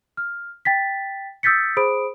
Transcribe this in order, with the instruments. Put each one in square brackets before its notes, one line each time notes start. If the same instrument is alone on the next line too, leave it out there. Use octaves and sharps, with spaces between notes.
[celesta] F6
G5 A6 B6
D#6 E6 G6 A6 B6 C#7
G#4 C5 B5 D#6 D7